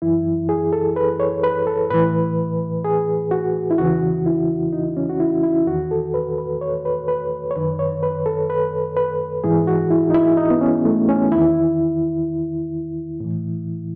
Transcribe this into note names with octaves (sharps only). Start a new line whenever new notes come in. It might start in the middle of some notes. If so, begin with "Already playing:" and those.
F#2 E3 E4
G#4
A4
B4
C#5
B4
A4
A2 E3 B4
G#4
F#4
E4
E2 C#3 E3 F#4
E4
D#4
C#4
F#4
E4
E4
E2 D#3 F#4
A4
B4
B4
C#5
B4
B4
C#5
F#2 D#3 B4
C#5
B4
A4
B4
B4
G#2 E3 G#4
F#4
E4
D#4
E4
D#4
B3
C#4
A3
C#4
E2 D#3 E4
A2 E3